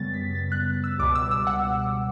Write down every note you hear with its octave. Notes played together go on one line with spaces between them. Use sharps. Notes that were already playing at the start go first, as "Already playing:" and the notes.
Already playing: F#2 C#3 G3 B3 A6
B6
A6
F#6
E6
C#2 B2 G3 D6
E6
E6
F#5